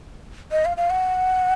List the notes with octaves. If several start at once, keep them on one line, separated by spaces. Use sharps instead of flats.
D#5
F5
F5
F#5